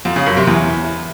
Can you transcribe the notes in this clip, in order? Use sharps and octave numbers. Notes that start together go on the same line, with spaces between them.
F2
C#3
F#2
C3
E2